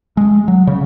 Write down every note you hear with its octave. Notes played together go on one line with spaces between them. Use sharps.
G#3
F#3
C#3